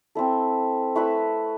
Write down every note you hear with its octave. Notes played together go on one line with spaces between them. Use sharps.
C4 E4 A4
A3 E4 B4 E5